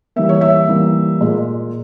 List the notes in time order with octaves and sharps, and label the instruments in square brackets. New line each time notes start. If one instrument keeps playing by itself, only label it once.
[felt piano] E3 G3 A#3 E5
C#5
E5
E3 G3 A#3
A#2 G#3